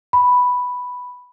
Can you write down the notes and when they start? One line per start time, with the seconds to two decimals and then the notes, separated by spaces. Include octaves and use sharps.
0.13 B5